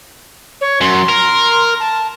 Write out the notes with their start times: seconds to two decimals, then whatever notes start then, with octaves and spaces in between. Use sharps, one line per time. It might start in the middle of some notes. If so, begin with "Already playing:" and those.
0.61 C#5
0.81 F#2 C6
1.09 A#4
1.80 A5